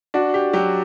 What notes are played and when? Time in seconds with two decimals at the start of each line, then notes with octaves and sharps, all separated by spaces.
0.14 D4 F#4
0.34 G4
0.53 F#3 G4